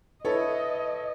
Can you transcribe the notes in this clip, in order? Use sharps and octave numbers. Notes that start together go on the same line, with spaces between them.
E4 A4 B4 C#5 D#5